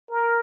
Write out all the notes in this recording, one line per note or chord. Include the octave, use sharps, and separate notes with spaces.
A#4